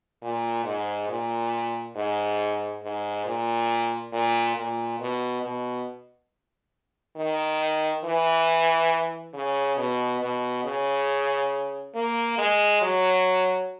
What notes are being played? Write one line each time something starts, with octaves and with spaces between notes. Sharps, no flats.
A#2
G#2
A#2
G#2
G#2
A#2
A#2
A#2
B2
B2
D#3
E3
C#3
B2
B2
C#3
A#3
G#3
F#3